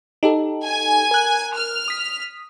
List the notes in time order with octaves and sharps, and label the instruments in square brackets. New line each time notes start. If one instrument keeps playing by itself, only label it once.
[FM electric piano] D#4 G4 A4
[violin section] G#5
[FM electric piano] A#4 F#6
[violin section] F6
[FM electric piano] D#6 B6